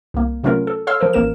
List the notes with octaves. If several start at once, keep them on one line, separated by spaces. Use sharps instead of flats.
C2 A#3
C3 F#3 A3 C#4 F4 A#4
A4
A4 C#5 F5 C6 E6 F6
F3 A#4 C5
A1 A#3 A#4 E7